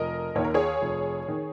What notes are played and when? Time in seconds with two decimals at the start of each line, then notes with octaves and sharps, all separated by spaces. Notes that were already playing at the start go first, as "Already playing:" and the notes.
Already playing: F1 A#4 D#5
0.35 D#2 D#3 C#5
0.45 A#4
0.54 G#4 C#5
0.82 F1
1.28 D#3